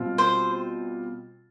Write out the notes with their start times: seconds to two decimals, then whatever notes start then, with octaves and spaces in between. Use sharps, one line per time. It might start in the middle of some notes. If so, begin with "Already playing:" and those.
Already playing: B2 G3 C4 F4
0.18 C5